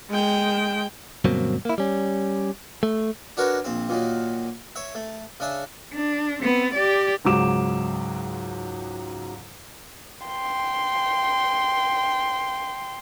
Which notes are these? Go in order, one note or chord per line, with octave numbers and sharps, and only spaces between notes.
G#3 G5
D2 G2 B2 F#3 A#3 C4
A#3 E4
G3 C#4
A3
D4 F#4 A#4 B4 C#5
A#1 C4
A#2 D#3 F#3
C#5 E5
A3
C#3 D4 E5
D4
B3 C4
G4 D5
C#2 G#2 F#3 D6 E7
G5 C6